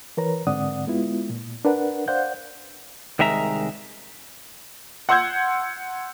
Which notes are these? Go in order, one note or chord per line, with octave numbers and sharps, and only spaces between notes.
E3 A#4 B4 C#5 A#5
G#2 D3 C4 D5 F#5 D#6
G#3 B3 E4 F4
A#2
D4 A#4 B4 D5 F#5
C5 D5 F5 F#5 G6
C2 D#3 G#3 E5 A#5
F#5 C6 E6 G6 G#6